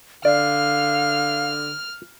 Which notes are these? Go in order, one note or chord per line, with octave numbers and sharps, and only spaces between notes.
D3 D5 F5 F6